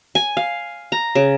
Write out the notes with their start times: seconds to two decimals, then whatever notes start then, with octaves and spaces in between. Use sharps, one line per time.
0.15 G#5
0.37 F5
0.92 A#5
1.15 C#3